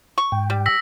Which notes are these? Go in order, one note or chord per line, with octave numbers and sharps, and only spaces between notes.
C#6
G#2 G5
G3
E6 A#6 B6